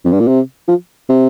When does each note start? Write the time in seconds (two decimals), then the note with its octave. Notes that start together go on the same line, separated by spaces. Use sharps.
0.05 F2
0.12 G2
0.20 A#2
0.28 C3
0.68 F3
1.09 C3